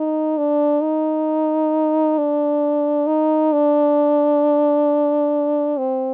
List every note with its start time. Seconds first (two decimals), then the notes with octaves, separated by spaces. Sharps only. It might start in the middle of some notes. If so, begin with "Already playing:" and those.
Already playing: D#4
0.38 D4
0.82 D#4
2.18 D4
3.07 D#4
3.53 D4
5.78 C4